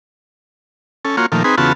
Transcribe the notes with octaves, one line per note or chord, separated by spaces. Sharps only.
C#4 A4
A#3 F4 F#4 C#5
A#2 D#3 F3 A3
C4 D#4 G#4 B4
E2 C#3 B3 F4 F#4 A5